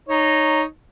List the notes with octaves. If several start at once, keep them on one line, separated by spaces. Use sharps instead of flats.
D#4 C#5